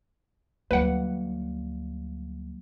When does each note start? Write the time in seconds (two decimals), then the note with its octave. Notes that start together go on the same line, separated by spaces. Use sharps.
0.71 D2 F#3 G3 A#3 B4 F#5